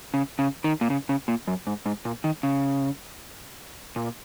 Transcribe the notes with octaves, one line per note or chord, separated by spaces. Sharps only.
C#3
C#3
D#3
A#2
C#3
C#3
A#2
F#2
G#2
G#2
A#2
D#3
C#3
A#2